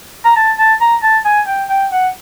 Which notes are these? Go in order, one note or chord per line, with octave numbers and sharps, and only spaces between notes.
A#5
A5
A5
A#5
A5
G#5
G5
G5
F#5